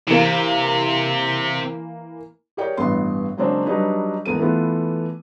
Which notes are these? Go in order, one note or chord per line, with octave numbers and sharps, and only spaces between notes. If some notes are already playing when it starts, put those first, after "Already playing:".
C3 E3 A#3
G4 G#4 A#4 C#5 D5 G5
A1 G2 B3 C6
C#3 F#3 G#3 A#3 C4 D4
F#3 G3 D4 D#4 B4
E2 G#3 A#3 B3 A4 D#7
E3 A3 B3 F4